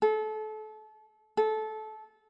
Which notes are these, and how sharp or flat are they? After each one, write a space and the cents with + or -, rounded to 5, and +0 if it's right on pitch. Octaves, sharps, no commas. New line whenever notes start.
A4 -30
A4 -20